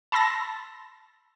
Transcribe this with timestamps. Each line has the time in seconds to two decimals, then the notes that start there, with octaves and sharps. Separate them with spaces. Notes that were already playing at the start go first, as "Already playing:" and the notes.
0.12 A5 B5 C6 E6 A6 A#6